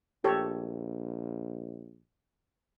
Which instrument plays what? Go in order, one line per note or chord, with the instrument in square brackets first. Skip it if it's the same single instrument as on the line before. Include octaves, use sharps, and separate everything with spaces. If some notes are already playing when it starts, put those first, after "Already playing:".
[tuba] A#1 [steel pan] G4 A4 C#5